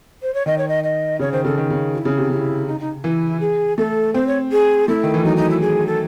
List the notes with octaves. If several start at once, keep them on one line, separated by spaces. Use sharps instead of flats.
C5
C#5
D#3 D#5
C#5
D#5
D#5
C#3 C#5
D#3 C5
C#3 A4
D#3
C#3
F#4
E4
C#3
C3
C#3 E4
D#4
D#4
E3 E4
G#4
A3 A4
C4 C5
C#5
G#4
A3 E4
D#3
E3
F#3 D#4
D#4
E4
G#4
A4